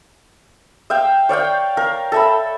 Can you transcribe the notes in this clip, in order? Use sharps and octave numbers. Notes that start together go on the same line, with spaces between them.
E5 F5 G5
C#5 D5 F5 G5
A#4 F5
A4 E5 B5